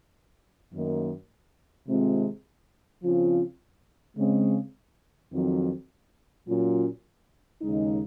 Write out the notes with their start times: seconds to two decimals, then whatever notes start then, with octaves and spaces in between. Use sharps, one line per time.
0.71 F#2 D#3 A#3 D#4
1.86 C3 D#3 G#3 C4 F4
3.02 C#3 F3 C4 F4
4.17 C#3 G#3 C4
5.32 F2 D#3 F#3 C4
6.47 A#2 F#3 C#4 F4
7.62 D#2 C#3 G#3 D#4